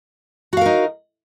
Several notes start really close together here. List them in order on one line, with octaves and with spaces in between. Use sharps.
F#4 F5 A#4 D#4